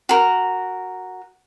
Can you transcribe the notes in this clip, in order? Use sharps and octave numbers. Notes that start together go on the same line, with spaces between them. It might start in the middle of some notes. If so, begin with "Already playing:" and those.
F#4 A#4